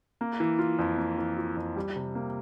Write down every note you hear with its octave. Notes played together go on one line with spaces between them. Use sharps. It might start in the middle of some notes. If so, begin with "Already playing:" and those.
A#3
E3
F4
F2
A#3
E3
F4
F2
G3
C3
A#3